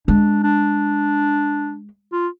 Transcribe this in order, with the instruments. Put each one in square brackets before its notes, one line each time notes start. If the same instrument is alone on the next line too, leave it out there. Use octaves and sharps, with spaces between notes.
[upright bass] G#3 [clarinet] D4
[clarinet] D4
F4